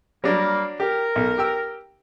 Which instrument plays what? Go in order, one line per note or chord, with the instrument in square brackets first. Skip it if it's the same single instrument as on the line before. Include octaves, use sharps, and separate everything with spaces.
[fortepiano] F#3 D4 [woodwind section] G3 A#3
[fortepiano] G4 [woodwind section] A#4
[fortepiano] B1
G4 G5 E6